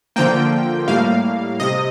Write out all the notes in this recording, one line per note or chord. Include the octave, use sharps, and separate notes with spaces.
D3 F3 A#3 G5
A2 G3 A#3 F5
C3 D#5